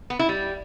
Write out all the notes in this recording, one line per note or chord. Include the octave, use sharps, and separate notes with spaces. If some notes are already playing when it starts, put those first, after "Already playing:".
B3
E4
G3